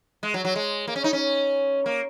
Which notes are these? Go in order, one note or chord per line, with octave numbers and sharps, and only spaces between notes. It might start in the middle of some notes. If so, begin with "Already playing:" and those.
G#3
F#3
F#3
G#3
A#3
C#4
D#4
C#4
A#3